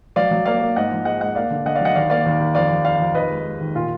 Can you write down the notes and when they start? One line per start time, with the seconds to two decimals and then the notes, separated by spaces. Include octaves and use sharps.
0.16 F#3 D5 F5
0.31 F#3
0.46 A#3 D5 F5
0.62 A#3
0.76 G#2 D#5 F#5
0.92 F3
1.05 G#3 D#5 F#5
1.21 G#3 D#5 F#5
1.35 A#3 D5 F5
1.50 D3
1.65 D3 D#5 F#5
1.76 D5 F5
1.81 F#3 D#5 F#5
1.95 D#2 D5 F5
2.10 A#3 D5 F5
2.26 D#2
2.40 D#2
2.55 F2 D5 F5
2.70 F2
2.85 F2 D5 F5
3.00 F2
3.15 D#2 B4 D#5
3.30 G#3
3.45 G#3
3.61 D#2
3.75 A#2 F4